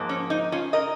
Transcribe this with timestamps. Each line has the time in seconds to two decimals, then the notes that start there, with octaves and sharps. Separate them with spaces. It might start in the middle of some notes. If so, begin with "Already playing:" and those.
Already playing: G#2 F3 A#3
0.09 C#4
0.30 D#4
0.52 C#4 F4
0.73 A#4 D#5